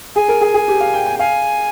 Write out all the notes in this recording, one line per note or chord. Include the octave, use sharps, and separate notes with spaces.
G#4 G#5
A#4
G#4
G#4
G4
F5
G5
G5
F5 G#5